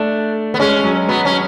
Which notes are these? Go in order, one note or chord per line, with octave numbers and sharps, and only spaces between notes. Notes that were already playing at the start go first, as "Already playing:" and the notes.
Already playing: A3 D4
B3
G#3 C#4
F#3
F#3 B3
C#4